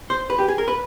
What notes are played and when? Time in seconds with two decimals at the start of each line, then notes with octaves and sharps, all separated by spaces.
0.10 C5
0.30 B4
0.39 G4
0.48 G#4
0.58 A#4
0.68 B4